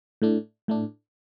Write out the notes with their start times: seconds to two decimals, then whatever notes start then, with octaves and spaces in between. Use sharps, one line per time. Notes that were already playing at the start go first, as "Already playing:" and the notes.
0.22 A2 A3 D4
0.68 A2 A3 D4